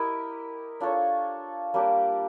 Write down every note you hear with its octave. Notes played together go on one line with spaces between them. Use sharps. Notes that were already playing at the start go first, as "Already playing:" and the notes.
Already playing: E4 G4 A#4 D#5
D4 F4 A4 C#5
G3 A#3 D4 G4